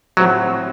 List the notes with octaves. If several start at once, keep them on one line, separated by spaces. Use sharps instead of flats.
A2 F3 F#3 C4 F#4